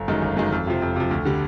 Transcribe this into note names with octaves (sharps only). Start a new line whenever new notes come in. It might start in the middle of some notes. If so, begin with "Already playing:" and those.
Already playing: G1
F#2 D#3 G#3
G1
F#2 D#3 G#3
F2
C3 F3
F2
C3 F3
D2
D3 G3